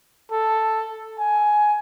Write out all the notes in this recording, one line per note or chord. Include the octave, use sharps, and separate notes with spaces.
A4
G#5